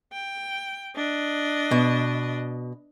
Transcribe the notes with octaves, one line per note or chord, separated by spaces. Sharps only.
G5
D4 D#5
B2